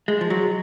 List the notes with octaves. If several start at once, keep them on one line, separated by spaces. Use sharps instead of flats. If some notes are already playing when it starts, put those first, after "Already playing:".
G#3
F3
F#3